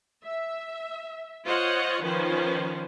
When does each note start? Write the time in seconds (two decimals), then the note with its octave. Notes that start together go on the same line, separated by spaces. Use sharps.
0.24 E5
1.44 F4 C5 C#5 D#5 F#5
2.02 D#3 F3 C#4 B4 C5